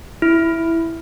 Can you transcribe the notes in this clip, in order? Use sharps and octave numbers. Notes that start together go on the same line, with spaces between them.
E4